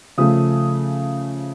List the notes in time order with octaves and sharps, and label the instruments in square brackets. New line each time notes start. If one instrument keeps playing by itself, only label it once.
[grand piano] C#3 F3 A3 D#6